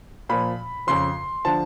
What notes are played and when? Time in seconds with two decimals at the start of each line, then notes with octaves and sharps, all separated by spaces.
0.29 A#2 F3 B5
0.87 F2 C#3 F3 C6
1.45 D3 F3 A5